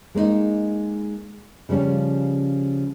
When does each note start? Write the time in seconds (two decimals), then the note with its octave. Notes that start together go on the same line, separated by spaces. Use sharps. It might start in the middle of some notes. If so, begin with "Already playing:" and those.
0.15 G#3 A#3 C#4 D#4
1.69 C#3 F3 G3 C#4